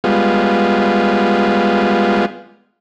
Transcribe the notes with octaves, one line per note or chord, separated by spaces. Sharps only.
G3 G#3 B3 F4